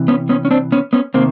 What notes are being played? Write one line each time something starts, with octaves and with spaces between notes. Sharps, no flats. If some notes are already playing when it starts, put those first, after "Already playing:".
Already playing: C3 E3
B3 C#4
B3 C#4
C#4
C4 D4
B3 C#4
B3 C#4
C3 D#3 A#3 C4